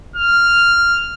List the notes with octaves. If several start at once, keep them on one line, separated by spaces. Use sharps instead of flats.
F6